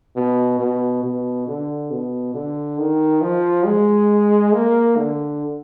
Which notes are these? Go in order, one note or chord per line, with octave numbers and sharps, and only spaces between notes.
B2
B2
B2
D3
B2
D3
D#3
F3
G#3
A#3
D3